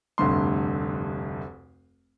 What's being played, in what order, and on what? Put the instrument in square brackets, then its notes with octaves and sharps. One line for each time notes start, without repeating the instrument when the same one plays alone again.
[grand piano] F1 D2 G2 C6